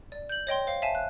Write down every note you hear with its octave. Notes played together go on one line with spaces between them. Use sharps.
D5
G6 F#7
C#5 D#5 G5 C6
C5 F5
E5 F5 G#5 A5
F#6